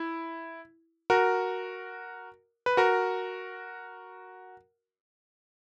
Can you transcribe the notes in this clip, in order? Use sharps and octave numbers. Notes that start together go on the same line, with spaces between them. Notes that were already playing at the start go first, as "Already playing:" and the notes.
Already playing: E4
F#4 A#4
B4
F#4 A#4